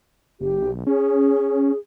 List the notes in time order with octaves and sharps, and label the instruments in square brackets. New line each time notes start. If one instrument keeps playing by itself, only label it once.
[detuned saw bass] F#1 [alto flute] G4
[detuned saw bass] B1
[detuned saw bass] C#4 [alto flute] G#4